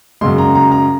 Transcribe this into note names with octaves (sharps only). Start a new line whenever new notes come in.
F#2 C#3 G#3 C6
A#5
A#5
A#5